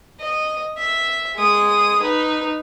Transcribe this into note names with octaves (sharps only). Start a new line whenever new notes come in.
D#5
E5
G#3 D#6
D#4 B4